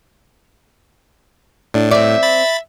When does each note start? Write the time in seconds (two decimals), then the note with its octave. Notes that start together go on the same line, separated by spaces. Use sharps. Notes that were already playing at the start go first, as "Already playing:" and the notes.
1.74 A2 D4
1.91 C4 D5 E5
2.23 B5 A6